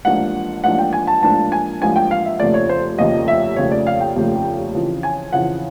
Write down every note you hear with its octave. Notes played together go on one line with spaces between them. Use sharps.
A1 G#2 F3 A#3 D4 F#5
A1 G#2 F3 A#3 D4 F#5
G5
G#5
A5
A1 G#2 F3 A#3 D4 A5
G#5
A1 G#2 F3 A#3 D4 G#5
G5
F5
E5
F1 D#2 C#3 F3 A3 D5
C#5
C5
F1 D#2 C#3 F3 A3 D#5
E5
F1 D#2 C#3 F3 A3 C#5
D5
F5
G5
F1 D#2 C#3 F3 A3
F2 C#3 E3
G#5
F2 C#3 E3 F#5